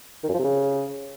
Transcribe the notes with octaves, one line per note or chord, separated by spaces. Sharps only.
D#3
F#2
F3
C3
C#3